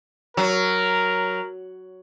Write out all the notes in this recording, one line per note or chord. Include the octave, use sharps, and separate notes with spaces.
F#3 A#4